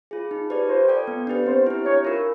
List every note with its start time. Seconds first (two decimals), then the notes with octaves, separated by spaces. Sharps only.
0.11 F4 G#4
0.31 D#4
0.50 G4 B4 D5
0.69 F4 C5
0.88 A4 D5 G5
1.07 B3
1.27 D4 G4 B4
1.46 C4 C5
1.66 E4 G4
1.85 D4 C#5
2.05 F4 A#4